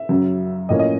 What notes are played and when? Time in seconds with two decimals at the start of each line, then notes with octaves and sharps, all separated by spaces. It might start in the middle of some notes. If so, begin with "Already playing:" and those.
Already playing: E5
0.09 F#2 C#3 F#3
0.69 A2 F3 A#3 C#4 D#5
0.79 D#5